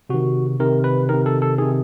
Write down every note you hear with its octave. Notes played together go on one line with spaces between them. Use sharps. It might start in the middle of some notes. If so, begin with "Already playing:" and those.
C3 D#3 F#4
C3 D#3 A#4
B4
C3 D#3 A#4
A4
A4
C3 D#3 G#4